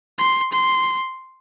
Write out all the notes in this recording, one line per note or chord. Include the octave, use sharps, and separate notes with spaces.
C6
C6